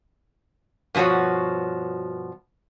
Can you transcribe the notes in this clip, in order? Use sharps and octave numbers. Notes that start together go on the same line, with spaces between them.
G2 B2 F3 F#4 C#5